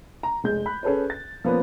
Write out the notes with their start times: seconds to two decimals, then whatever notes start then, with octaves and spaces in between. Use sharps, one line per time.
0.23 A#5
0.44 F1 G#3 G#4 G6
0.66 B5 F#6
0.83 C#4 G#4 A4 B4 C#5
1.10 A6
1.45 F3 A#3 B3 C#4 B4